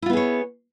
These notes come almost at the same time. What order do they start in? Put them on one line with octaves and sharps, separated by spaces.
E4 F4 B3 G#4 C#5